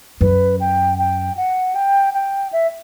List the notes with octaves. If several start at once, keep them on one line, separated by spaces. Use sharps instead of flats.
F#2 B4
G5
G5
F#5
G5
G5
E5